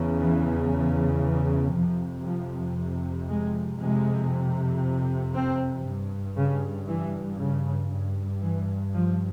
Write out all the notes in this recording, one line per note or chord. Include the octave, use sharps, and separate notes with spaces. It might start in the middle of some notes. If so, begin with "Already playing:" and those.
Already playing: E2 C#3
E3
E3
F2 C3 F3
F3
G#3
F2 C3 G#3
C4
G2
C#3
E3
C#3
G2
E3
F3